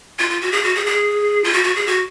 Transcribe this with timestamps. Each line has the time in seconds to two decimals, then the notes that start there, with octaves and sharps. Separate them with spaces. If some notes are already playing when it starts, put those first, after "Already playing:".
0.19 F4
0.30 F4
0.41 F#4
0.52 G#4
0.63 F#4
0.75 G#4
0.86 G#4
1.44 F4
1.53 F#4
1.63 F#4
1.75 G#4
1.87 F#4